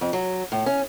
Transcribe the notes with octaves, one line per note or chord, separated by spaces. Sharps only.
F2
F#3
A2
C#4